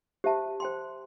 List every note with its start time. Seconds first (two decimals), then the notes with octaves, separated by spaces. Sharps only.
0.24 G4 C5 E5 A5
0.60 C5 G5 C6